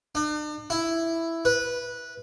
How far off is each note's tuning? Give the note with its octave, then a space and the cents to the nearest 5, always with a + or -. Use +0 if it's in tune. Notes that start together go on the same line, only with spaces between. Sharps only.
D4 +45
E4 +5
B4 -15